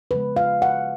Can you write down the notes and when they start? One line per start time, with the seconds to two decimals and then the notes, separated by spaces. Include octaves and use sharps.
0.11 C#3 F3 G#3 B4
0.36 F5
0.62 F#5